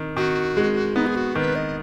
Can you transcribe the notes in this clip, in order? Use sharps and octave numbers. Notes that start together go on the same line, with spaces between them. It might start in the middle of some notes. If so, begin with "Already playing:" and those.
Already playing: D#3
D#3 F#4
G#3
B3 D#4
G#4
F#4
D#3 B4
D#5